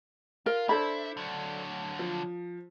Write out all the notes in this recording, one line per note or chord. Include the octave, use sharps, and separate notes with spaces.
F4 A#4
D4 E4 A4 C5 B5
D3 F#3
F3